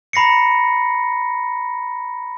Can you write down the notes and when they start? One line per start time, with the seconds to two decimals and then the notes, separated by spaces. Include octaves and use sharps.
0.13 A#5 B5 A#6 C7 C#7